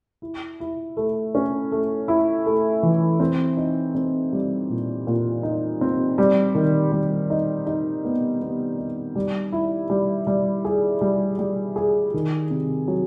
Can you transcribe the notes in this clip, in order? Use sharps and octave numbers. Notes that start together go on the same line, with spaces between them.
E4
E4
A3
C#4
A3
E4
A3
E3
C4
D#4
C4
G3
A#2
A#2
D#4
C4
G3
D#3
G3
D#4
D#4
B3
B3
D#4
G3
E4
G3
G3
G#4
G3
G3
G#4
D#3
C3
F#3